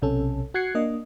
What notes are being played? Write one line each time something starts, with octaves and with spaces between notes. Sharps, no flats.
B1 C3 C#4 A4
F#4 F#6 G#6 C7 C#7
A#3 D4 D#5